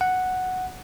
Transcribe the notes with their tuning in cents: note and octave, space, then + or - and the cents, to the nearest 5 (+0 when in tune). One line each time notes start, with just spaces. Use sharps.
F#5 +0